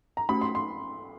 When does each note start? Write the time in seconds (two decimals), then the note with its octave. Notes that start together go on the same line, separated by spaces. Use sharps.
0.17 A#5
0.29 A3 C#4 F#4 B5
0.41 C6
0.55 C6